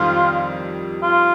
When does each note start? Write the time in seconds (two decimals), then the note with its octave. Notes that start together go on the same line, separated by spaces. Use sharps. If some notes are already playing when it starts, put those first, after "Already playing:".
Already playing: F2 D#3 G3 F4
1.03 F4